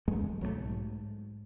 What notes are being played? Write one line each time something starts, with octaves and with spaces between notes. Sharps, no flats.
G2 F#3 G#3 A3
B1 F#3 G3 A3
G#2